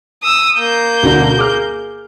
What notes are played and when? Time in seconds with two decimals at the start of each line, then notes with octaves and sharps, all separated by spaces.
0.23 D#6 E6
0.59 A#3 G6
1.03 D2 B2 D3
1.37 G#4 D6 F6